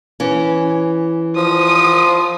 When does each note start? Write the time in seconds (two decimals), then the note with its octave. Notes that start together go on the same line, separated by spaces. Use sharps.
0.20 E3 C#4
1.36 F3 D#6